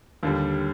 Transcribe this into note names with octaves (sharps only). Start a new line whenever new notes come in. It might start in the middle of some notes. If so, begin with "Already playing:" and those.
D#2 D3 G3